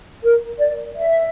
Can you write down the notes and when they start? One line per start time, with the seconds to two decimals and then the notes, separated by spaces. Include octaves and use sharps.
0.23 A#4
0.59 D5
0.97 E5